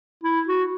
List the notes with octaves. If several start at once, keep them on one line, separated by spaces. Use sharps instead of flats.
E4
F#4